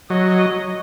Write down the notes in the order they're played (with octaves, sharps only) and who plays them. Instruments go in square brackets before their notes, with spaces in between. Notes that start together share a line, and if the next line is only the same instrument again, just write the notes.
[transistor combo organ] F#3 [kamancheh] D#5